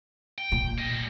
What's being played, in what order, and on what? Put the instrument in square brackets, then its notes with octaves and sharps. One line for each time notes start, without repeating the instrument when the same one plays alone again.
[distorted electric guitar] G5
[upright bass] A#2
[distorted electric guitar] G3 D#5